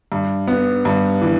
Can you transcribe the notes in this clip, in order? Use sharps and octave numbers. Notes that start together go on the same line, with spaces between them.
G2
B3
G2
E3